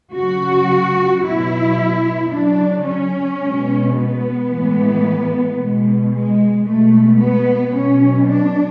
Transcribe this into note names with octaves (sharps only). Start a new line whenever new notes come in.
C#3 F#3 F#4
B2 F#3 E4
C#3 F#3 D4
C#4
B2 G#3
B3
A2 E3 G#3
B2 G#3
G#3
B2 G#3 A3
B3
B2 F#3 C#4
D4